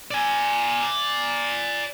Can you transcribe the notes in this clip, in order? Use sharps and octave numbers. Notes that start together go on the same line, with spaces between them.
D5 G#5